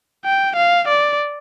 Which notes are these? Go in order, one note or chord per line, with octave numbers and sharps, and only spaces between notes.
G5
F5
D5